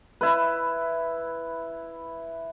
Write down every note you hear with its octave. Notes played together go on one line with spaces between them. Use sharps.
E4 B4